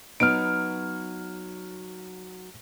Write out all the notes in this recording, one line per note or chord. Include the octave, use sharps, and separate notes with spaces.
F#3 B3 D#4 F6 D7